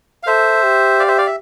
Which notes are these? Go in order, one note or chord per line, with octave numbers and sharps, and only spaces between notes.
F5
A4 C5 E5
G4
D5 F5
C5 E5
D5 F5
E5